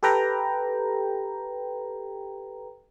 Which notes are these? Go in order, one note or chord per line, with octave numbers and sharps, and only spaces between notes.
G4 A4 B4 G5 A#5